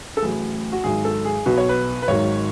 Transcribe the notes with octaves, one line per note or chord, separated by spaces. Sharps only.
A4
A1 A2 F#3 G#4
F#4
G#1 G#2 F#3 G#4
A4
G#4
B1 B2 F#3 B4
C#5
B4
B4
G#1 G#2 D#3 F#3 C#5